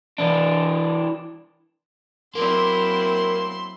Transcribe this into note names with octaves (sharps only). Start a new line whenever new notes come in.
E3 D4
F#3 A#3 C4 E4 C6